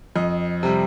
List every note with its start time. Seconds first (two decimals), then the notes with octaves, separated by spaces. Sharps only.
0.15 F2 D#5
0.63 C3 G3